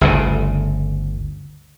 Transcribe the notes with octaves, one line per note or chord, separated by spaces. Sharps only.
G1 D2 C#3